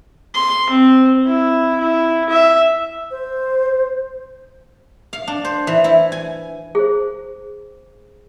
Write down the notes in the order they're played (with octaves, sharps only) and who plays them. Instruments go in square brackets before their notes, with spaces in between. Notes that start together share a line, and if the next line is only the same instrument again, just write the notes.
[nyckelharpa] C6
C4
E4
E4
E5
[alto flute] C5
[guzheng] F5
D4
C5
E3
E4
G#5
[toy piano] G#4 C5